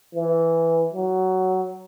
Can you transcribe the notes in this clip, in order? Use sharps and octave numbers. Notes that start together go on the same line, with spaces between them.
E3
F#3